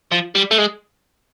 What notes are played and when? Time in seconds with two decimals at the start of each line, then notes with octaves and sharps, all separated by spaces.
0.11 F3
0.35 G3
0.51 A3
0.58 G#3